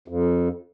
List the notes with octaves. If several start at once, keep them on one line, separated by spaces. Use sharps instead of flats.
F2